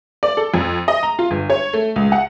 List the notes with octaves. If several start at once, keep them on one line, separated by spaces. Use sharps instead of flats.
D5
A4
F2
D#5
A#5
F4
G1
C#5
A3
C#2
F#5